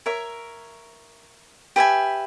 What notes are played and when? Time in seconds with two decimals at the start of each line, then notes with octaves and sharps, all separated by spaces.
0.06 A#4 C#5 E5
1.76 G4 B4 E5 G#5